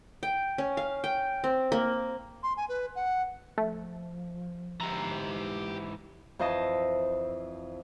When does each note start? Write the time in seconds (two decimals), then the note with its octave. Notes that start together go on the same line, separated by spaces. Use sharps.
0.23 G5
0.58 C#4
0.77 F5
1.04 G5
1.44 C4
1.72 A#3
2.43 C6
2.57 G#5
2.69 B4
2.96 F#5
3.58 F3 A3
4.81 G#2 E3 G4 A#5
6.39 F2 E3 C5 D#5 A5